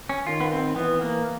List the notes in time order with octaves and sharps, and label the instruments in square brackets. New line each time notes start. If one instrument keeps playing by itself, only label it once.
[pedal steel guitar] C#4
[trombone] D#3 [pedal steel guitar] F4
[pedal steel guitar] B3
C4
[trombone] E3 [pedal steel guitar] B3
[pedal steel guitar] A#3